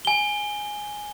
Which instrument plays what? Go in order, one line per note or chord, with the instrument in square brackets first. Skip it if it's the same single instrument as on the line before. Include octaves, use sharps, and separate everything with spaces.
[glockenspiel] G#5 G7